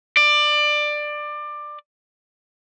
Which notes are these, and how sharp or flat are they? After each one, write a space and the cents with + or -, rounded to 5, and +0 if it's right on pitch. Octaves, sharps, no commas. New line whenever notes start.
D5 +20